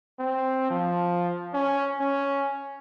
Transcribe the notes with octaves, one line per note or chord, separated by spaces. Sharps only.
C4
F3
C#4
C#4